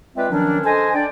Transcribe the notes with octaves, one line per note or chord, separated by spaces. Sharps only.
G#3 C4 F4 B4 D5 E5
D#3 F3 F#3 C#4 D4
A4 C5 D#5 G#5
D4 D5 G5